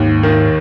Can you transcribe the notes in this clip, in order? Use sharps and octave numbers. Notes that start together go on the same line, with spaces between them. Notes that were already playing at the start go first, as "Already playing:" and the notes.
Already playing: D#2 G#2
D#3